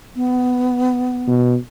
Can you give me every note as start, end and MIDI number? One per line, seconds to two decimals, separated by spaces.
0.16 1.38 59
1.28 1.56 47